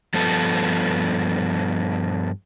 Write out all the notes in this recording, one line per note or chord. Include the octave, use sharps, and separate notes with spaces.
G2 F3 B3 A4